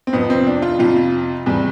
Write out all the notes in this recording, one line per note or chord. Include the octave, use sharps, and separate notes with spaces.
C4
F2 C3 F3 B3
C4
D4
F4
F2 C3 F3 F4
E2 C3 G3